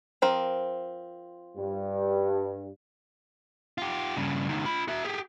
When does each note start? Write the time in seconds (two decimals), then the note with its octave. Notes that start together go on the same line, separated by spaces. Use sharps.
0.22 F3 C4 A#4
1.57 G2
3.78 F4 G4
4.16 G2 C#3
4.49 C#2 D#3
4.65 F4 B5
4.88 F#4 E5
5.04 G4 G#4